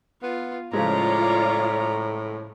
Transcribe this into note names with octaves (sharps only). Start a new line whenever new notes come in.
B3 F4
A2 C#3 F3 G#3 F4 C#5 D5 A#5